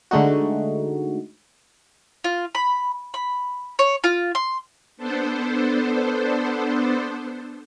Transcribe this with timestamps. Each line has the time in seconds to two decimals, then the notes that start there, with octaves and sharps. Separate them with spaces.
0.11 D3 G#3 A3 D#4 F#4
2.24 F4
2.55 B5
3.14 B5
3.79 C#5
4.04 F4
4.35 C6
4.97 B3 D4 A4 C5